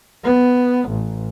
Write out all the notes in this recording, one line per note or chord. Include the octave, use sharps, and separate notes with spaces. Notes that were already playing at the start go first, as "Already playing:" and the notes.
B3
A1